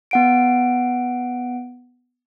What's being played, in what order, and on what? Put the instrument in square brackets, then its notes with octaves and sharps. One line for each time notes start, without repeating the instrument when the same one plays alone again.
[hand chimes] B3 F#5 D7